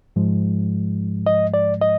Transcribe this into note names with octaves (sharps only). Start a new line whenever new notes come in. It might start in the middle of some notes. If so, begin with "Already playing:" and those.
G#2 F3 G#3
D#5
D5
D#5